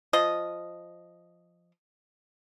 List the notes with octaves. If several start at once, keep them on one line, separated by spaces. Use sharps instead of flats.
F3 D#5